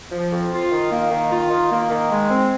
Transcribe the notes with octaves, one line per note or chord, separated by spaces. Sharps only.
F3
F2
F4
D#3
A#3
D#3
F4
D#3
A#3
D#3
G#3
C4